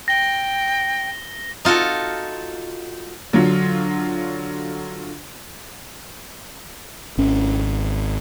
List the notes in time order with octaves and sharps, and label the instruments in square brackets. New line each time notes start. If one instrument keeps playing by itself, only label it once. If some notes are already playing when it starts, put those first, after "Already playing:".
[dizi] G5 [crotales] A#6 G7
[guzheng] D#4 F4 F#4 A4
[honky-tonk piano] D3 F#3 F4
[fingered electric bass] G#1 C#4